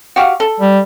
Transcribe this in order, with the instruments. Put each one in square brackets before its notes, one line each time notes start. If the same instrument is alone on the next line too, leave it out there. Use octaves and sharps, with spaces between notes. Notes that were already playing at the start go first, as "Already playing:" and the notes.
[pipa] F#4 G4 F5
A4
[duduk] G3